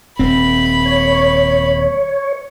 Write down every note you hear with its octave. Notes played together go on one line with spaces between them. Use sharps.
D#1 C4 B5
C#5